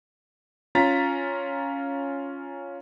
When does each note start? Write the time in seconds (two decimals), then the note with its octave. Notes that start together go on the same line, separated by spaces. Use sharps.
0.75 C#4 F4 A#5 A6 B6